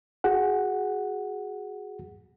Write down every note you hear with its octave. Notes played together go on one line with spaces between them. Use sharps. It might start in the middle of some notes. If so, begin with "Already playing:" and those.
F#4 G#4 F#5